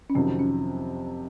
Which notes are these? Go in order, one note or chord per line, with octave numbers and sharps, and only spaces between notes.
C#4
F2 C3 D#3 F#3 C4
C#4